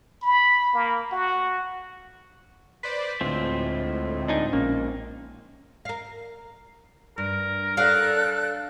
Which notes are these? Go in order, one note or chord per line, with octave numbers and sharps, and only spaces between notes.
B5
A#3
F#4
B4 C5 D5 B6
D2 A2 G#3 C4 F4
D4 D#4 G#5
A#1 A#3 C#4
A#4 F5
G2 A#4
D4 A4 C#5 F5 F#6